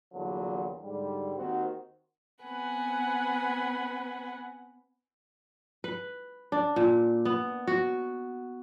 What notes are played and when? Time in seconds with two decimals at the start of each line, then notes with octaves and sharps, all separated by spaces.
0.14 E2 G2 A#2 D3 F#3
0.81 G#2 D3 G3
1.36 D#2 D#3 C4 F#4
2.44 B3 C4 B4 F#5 G#5
5.84 B4
6.52 D4
6.76 A#2
7.25 B3
7.67 F#4